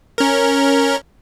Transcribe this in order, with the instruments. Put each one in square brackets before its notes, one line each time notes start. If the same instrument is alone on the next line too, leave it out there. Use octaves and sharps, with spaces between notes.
[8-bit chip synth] C#4 A#4